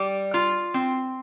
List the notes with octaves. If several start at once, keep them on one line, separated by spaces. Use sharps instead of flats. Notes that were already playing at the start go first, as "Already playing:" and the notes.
Already playing: G3
F4
C4